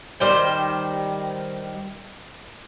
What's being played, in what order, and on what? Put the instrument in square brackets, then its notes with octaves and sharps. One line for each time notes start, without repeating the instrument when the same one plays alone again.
[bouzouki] D#3 G3 C5 G5